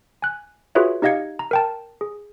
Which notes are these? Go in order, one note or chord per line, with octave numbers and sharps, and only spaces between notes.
G#5 F#6
F4 F#4 G#4 B4 C#5 E5
D#4 G4 D#5 F5 G#6 C#7
A#5
A#4 G5 A5
G#4